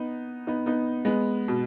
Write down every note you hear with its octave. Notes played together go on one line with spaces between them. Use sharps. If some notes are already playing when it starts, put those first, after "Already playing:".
Already playing: B3 D#4
B3 D#4
B3 D#4
G#3 B3
B2